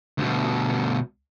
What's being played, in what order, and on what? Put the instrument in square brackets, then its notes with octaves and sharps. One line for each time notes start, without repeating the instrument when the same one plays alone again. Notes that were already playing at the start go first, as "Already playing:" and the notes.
[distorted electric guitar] D2 B2